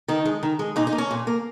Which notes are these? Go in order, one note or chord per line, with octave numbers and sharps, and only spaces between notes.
D#3 D#4
G#3
D#3
G#3
A#2 D#4
D#4
A#3
C#4
A#2
A#3